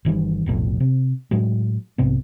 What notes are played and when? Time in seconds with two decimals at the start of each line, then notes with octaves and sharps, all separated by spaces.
0.05 G1 D#3 E3 G3
0.46 F1 B1 A2 F3
0.80 C3
1.31 A2 F#3 G#3
1.98 B1 G#2 C3 B3